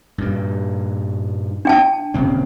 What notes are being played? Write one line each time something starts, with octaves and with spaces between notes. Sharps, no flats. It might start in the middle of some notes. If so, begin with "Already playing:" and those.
G2 A#2 G3
D4 G5 A5
D#1 C#3 C4